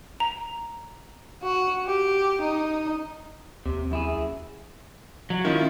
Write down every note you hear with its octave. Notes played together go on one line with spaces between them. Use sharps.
A#5
F#4
G4
D#4
D#2 C3
F#2 E4 G#4
F#3
D#3 C#4 E4 F4